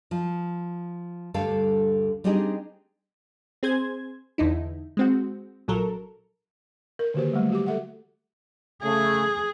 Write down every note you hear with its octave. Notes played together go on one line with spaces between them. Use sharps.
F3
D2 G2 D3 G3 A4 F5
G3 C4 D4 D#4 G4 G#4
C4 G#4 C5 G#6
E2 D3 D#4 E4
G#3 C4 F#4
A#1 F#3 A4 A#4
A#4
D3 D#3 A#3 F#4 G4 C5
F#3 G3 A3
F#4 G4 D6
A4 E5 F#5
C#3 A3 G#4